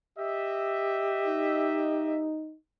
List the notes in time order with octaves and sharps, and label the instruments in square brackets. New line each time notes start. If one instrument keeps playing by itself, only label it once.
[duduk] G4 [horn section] D#5 E5
[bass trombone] D#4